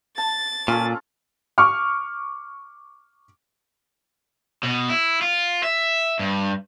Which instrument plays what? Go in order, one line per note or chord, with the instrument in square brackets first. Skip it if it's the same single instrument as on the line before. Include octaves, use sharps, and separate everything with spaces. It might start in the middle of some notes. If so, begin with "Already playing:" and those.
[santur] A5 [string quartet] A6
[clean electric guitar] A#2 [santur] C#4 F4 A4
[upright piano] C#6 D6 F6
[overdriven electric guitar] B2
E4
F4
E5
G2